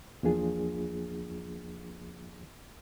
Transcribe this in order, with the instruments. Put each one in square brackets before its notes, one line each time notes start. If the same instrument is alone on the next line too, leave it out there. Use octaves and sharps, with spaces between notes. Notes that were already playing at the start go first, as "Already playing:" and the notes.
[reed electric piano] E2 F3 A#3 D4 F4 G#4